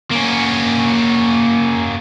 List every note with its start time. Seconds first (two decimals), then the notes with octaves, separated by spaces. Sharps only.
0.11 A#3 C#4